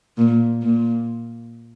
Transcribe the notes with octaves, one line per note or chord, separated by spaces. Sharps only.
A#2
A#2